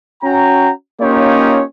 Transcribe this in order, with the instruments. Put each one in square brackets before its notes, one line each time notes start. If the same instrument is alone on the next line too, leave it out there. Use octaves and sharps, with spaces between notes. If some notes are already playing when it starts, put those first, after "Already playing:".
[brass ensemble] C#4 F#4 G5 A#5
A#3 C#4 D#4 F4 G4 C#5